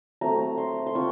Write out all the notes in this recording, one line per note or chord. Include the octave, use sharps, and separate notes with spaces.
F#3 A3 C4 A#5
C6
C6
C4 F4 C#6